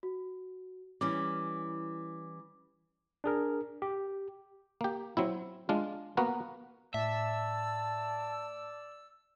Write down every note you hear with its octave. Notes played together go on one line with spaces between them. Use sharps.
F#4
E3 G3 C#4 D6
D4 G#4 A#4
G4
A#3 G4
F#3 C4 E4
G#3 D4 F4
A#3 B3 F#4 A#4 B4
A2 D5 E5 A5 E6